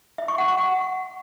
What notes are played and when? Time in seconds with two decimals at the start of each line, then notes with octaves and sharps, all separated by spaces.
0.18 E5
0.28 C#6
0.38 F#5
0.48 C#6
0.58 F#5